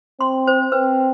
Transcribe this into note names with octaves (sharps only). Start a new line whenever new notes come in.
C4 C6
C5
C4 B4